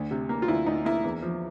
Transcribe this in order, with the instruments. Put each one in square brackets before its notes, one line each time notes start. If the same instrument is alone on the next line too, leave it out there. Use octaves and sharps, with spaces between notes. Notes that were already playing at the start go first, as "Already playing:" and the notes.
Already playing: [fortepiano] D2
C3
A#3
F4
D2 E4
D2 D#4
A#3 E4
E2
F3